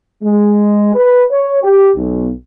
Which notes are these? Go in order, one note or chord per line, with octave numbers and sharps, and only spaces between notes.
G#3
B4
C#5
G4
B1